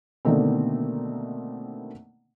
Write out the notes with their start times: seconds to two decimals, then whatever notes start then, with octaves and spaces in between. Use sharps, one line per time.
0.25 B2 D3 D#3 A3 A#3 C4